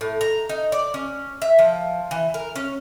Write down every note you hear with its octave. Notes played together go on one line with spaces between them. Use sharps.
A2
A#5
D#4
D5
C#4
E5
F3
E3
A#4
C#4